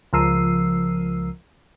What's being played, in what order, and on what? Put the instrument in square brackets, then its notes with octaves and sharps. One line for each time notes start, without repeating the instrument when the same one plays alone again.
[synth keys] C#2 F3 A#4 E6 C7 D#7